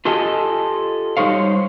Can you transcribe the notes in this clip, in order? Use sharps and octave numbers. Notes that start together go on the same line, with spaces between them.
F4 G4 A4 D#5 G#5
G3 D#4 C5 C#5 F5